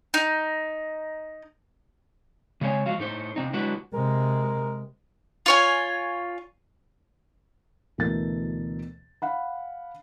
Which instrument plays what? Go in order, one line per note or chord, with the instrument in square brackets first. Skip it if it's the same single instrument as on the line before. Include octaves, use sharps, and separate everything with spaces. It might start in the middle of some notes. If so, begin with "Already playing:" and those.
[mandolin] D#4
[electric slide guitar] C#3 G#3 C4 C#5 D#5 G#5
F3 G#3 F#4 F5
A2 A3 D#4 C5
C3 C4 D#4
D3 F#3 G#3 E4 F#4 B4
[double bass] C3 G#3 [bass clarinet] A#4
[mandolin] F4 C#5 G#5
[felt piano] D2 B2 E3 A4 A#4 A6
F5 F#5 B5